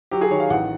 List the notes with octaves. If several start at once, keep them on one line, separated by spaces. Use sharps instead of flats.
F#3 G4
G#4
D#3 C#5
F5
A1 F#5